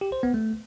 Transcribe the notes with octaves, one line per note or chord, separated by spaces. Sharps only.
G4
C5
B3
A3